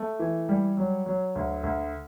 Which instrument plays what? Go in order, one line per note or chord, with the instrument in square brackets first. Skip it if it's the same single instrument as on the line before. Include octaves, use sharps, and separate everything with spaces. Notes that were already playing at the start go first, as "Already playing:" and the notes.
Already playing: [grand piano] A3
E3
G3
F#3
F#3
D2
D2